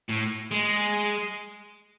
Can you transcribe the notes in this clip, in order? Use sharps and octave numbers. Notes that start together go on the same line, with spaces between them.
A2
G#3